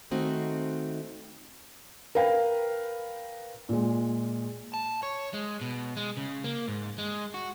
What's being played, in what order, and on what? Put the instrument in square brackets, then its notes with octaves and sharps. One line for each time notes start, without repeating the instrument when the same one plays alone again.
[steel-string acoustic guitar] D#3 A3 C4 D#4 F#4
[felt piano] A#4 B4 F5 G5
A#2 G#3
[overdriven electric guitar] A5
C#5
G#3
B2
G#3
C#3
A#3
G#2
G#3
F#4